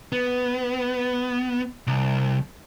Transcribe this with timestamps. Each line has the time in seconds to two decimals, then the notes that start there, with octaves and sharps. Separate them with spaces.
0.12 B3
1.87 C2